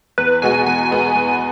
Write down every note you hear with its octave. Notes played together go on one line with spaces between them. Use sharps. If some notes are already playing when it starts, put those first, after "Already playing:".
E2 B4
B2 G#3 B3 F#4 G#5
E2 G#5
B2 G#3 B3 F#4
E2